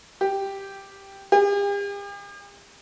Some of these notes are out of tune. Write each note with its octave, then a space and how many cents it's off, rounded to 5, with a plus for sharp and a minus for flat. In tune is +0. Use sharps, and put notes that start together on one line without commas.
G4 +0
G4 +45